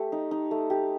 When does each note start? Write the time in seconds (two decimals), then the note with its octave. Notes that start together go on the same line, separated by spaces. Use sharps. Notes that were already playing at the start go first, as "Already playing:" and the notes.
Already playing: A3 G4
0.12 D#4
0.31 D#4
0.51 A3
0.70 G4